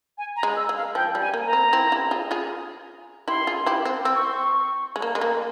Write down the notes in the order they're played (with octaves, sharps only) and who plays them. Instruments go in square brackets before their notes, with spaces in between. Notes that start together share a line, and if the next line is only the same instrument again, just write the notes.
[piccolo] G#5
A#5
[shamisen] G#3
[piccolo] E6
[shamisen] G#3
[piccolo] F5
[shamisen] F3 [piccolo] G5
[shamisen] G3
[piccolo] G#5
[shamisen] A#3
[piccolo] A#5
[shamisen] C4
C4 E4
E4 G4
F4 G#4
F4 G#4
[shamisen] E4 G4 [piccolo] C6
[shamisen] F4 G#4
E4 G4
C4
[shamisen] C4 [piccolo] E6
[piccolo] C#6
C6
C#6
[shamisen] G#3
A#3
G#3
A#3